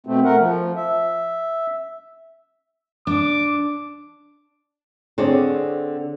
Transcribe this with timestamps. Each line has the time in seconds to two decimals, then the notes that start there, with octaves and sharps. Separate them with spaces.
0.07 B2 A3 C4
0.24 A3 A#4 F#5
0.39 F3
0.76 E5
3.07 D4 D6
5.18 D3 C4 G#4 C#5 D5